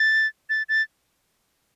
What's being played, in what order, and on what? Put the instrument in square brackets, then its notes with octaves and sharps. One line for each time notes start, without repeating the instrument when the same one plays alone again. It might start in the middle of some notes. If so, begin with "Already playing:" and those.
Already playing: [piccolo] A6
A6
A6